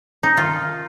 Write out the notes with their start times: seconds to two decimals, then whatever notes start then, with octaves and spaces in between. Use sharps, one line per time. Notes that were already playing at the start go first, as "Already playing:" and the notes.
0.23 D#4
0.37 D#3 F4